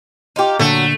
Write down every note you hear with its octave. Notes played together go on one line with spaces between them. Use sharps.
D#4 F4 G4
A#2 D3 F#3 A3